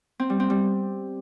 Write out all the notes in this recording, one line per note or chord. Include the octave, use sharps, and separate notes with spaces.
C4
G3
C4
G3